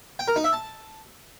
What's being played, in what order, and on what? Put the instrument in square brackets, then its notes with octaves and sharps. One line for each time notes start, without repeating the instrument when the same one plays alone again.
[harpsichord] G5
A#4
D#4
E5
A5